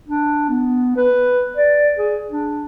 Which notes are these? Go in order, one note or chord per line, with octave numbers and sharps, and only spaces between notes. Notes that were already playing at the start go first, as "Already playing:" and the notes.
D4
B3
B4
D5
G#4
D4